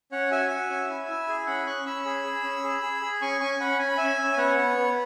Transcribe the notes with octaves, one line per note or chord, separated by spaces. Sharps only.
C#4 C#5 F#5
F#4 E5 G#5
F#4
C#4
E4
E4
G#4
C#4 F#5 B5
C#4 C#6 F#6
C#4 B5 E6
G#4
G#4
C#4
G#4
G#4
G#4
C#4 G#5 C#6
C#4 G#5 C#6
C#4 F#5 B5
C#4 G#5
B5
C#4 E5 G#5
C#4
G#5
B3 C#5 F#5
B3
B3